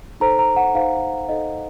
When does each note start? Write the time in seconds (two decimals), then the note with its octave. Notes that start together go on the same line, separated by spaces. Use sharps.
0.20 D#4 A4 C5 A#5
0.39 A#5
0.56 F#5
0.74 D#4 A4 C5 F5
1.29 D#4 A4 C5 D#5